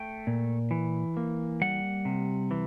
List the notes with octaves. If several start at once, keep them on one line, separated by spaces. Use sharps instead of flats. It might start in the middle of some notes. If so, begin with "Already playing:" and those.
Already playing: A3 G5
A#2
E3
A#3
G3 F#5
C3
E3